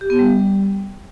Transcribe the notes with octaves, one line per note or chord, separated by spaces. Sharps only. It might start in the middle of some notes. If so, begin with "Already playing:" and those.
G4
B3
G3